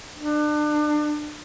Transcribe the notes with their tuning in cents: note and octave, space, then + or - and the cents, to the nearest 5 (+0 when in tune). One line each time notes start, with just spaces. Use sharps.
D4 +30